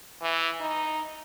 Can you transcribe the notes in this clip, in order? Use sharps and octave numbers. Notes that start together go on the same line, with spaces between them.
E3
D#4